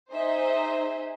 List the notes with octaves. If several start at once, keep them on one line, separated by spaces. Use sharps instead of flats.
D#4 G#4 C5 D#5 E5